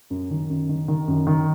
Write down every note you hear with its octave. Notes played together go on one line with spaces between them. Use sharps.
F#2
D#3
F#2
D#3
D#3
F#2
D#3